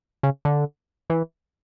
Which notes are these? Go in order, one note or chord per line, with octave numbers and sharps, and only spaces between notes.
C#3
D3
E3